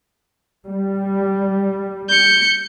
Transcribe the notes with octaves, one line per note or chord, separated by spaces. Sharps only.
G3
G6 C#7